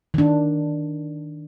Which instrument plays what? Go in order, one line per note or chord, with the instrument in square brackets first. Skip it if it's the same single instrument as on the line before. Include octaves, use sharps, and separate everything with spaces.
[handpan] D#3 D4